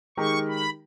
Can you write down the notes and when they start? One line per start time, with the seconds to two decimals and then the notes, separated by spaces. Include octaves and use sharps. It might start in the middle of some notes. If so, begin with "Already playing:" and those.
0.17 D#3 G#3 D#4 G4 A#4 C#6
0.48 B5